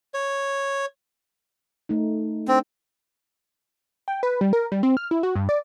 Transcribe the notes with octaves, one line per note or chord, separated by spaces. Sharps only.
C#5
A3 D#4
C4 D4
G5
B4
G3
A#4
G3
C4
F6
E4
F#4
G2
D5